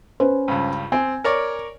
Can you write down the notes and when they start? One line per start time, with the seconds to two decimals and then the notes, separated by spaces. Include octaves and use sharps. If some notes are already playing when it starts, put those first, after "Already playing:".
0.20 C#4 B4 C5
0.48 C#2 G2
0.92 C4 G#5
1.24 A#4 C#5 D5